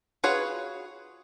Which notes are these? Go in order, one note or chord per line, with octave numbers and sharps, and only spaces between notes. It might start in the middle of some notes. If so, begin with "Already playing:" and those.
F4 F#4 G#4 B4 C#5